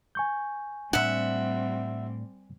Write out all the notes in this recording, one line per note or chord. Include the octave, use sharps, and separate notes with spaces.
G#5 C#6 G6
A2 G3 C4 D4 E5 F#5